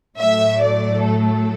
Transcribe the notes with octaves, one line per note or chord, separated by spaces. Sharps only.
A2 F#3 A3 E5
D5
A4